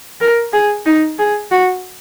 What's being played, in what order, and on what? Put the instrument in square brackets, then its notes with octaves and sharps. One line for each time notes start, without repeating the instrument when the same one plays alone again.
[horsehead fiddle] A#4
G#4
D#4
G#4
F#4